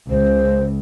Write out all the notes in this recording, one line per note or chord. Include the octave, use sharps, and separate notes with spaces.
C#2 C5